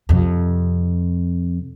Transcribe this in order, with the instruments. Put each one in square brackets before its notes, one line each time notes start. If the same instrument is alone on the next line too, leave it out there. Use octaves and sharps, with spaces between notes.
[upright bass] F2 C3